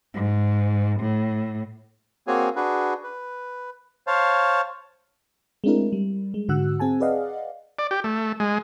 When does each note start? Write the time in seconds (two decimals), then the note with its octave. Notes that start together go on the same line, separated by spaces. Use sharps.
0.14 G#2
1.00 A2
2.27 A#3 C4 F#4 G#4 C#5 G#5
2.56 D4 F#4 G#4 B4
3.03 B4
4.07 C5 C#5 F5 A5
5.64 G#3 A3 C4 D4 E4 A#4
5.92 G3
6.34 G#3
6.49 G#2 D3 F#4 F#5 E6 F#6
6.80 C4 G#4 G#5 A5
7.00 G#4 B4 D5 D#5 F5 F#5
7.79 D5
7.91 G4
8.04 A3
8.40 G#3